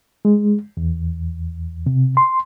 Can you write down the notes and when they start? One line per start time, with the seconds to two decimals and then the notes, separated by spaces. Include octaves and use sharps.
0.25 G#3
0.77 E2
1.86 C3
2.17 C6